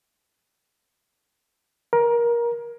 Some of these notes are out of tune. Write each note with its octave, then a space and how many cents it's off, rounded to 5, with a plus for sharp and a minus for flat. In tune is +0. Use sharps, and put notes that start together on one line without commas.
A#4 +20